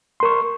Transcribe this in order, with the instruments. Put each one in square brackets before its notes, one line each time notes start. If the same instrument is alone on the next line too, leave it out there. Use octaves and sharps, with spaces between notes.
[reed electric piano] C6
A#4
C#6